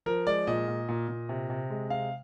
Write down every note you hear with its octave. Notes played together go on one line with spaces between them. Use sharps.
F3 A#4
G#3 D5
A#2 D#5
A#2
A#2
A#2
C3
C3
G#3
C3 F5